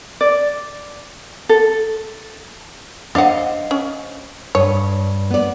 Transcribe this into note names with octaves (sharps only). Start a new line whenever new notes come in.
D5
A4
D4 C5 D#5 F5 F#5
C#4
G2 C#5
B3 D5